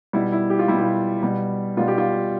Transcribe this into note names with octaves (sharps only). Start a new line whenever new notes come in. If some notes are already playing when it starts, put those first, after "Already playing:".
B2 G3 E4
E4
G4
F4
B2 G3 E4
F4
B2 G3
B2 G3 F4
G4
F4